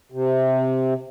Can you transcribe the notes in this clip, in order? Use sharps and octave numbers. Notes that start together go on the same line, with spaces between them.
C3